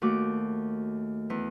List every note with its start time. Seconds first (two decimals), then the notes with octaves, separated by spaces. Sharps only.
0.02 D#2 A3 F#4 D6
1.30 E2 E4